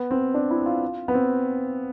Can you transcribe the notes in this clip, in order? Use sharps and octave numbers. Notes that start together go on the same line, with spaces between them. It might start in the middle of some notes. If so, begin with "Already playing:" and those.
Already playing: B3
C4
D4
E4
F4
B3
C4